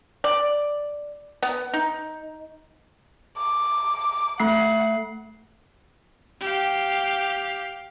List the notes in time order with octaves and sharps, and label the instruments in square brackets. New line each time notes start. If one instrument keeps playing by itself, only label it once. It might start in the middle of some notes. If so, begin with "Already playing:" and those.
[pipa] D5
B3
D#4
[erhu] D6
[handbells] A3 C7 [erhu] F#5
[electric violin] G4 F5